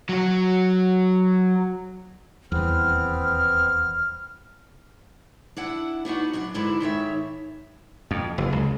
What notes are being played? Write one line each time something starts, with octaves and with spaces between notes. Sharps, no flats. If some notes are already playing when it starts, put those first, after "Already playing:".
F#3 F#4
D#1 E2 B3 C4 F6
D4 E4 F#5
B3 D4 D#4 F#4
F#2 D4 F#5
G#2 D3 E4 B4 D5 A5
G#2 D#3 C#5 E5
F2
F#1
C#2